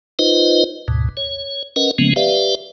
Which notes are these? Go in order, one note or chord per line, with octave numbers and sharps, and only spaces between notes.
D#4 F4 B4 C5 D#5
D2 G#2 B2
C#5
C#4 A#4 B4 D#5 F#5
C#3 F3 G#3 A#3 B3 C#4
G4 B4 D5 E5 F5